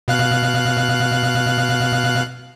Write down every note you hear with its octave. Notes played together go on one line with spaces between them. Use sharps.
B2 F5 F#6